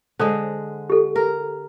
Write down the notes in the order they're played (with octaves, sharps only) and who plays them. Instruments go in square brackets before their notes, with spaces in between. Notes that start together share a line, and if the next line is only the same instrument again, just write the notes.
[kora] D3 G#3 [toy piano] C5 C#5 D#6
[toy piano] G4 A4
[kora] A#4